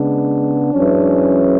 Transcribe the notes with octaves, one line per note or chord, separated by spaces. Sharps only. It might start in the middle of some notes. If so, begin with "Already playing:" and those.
Already playing: C#3 G#3 B3 D4
F#2 E3 G#3 C#4